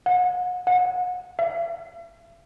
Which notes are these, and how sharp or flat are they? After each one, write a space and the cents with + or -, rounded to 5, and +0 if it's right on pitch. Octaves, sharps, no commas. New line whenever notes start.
F#5 -35
F#5 -30
E5 +45